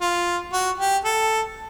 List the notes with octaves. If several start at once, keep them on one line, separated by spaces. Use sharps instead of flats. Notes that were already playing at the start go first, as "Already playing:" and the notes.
F4
F#4
G4
A4